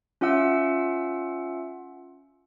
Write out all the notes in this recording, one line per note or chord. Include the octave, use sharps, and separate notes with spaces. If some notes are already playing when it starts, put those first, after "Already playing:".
C#4 F4 E5 F#5 E6